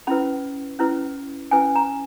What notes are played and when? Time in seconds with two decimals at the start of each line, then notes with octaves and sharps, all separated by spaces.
0.07 C#4 E4 B4 B5
0.79 C#4 E4 B4
1.51 C#4 E4 B4 G#5
1.75 A#5